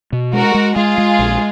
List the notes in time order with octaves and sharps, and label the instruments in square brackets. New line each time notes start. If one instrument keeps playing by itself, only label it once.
[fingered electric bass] B2
[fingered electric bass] G#3 [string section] F#4 A#4
[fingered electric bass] G#3
[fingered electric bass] G#3 [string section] F4 G#4
[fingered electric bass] G#3
A#1